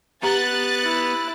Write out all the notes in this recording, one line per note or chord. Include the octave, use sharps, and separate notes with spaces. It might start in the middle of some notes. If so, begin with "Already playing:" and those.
B3 G4 A#5 F#6 A6
E4